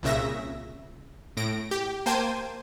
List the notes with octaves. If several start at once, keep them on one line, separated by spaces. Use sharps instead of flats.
C2 A#2 C#3 E5 A#6
A2 A#6 D7
G4
A#3 C5 G5 A5 G#6 D#7